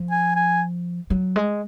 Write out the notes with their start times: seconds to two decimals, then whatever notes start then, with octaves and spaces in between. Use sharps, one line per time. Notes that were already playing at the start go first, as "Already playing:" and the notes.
Already playing: F3
0.11 G#5
0.36 G#5
1.10 F#3
1.36 G#3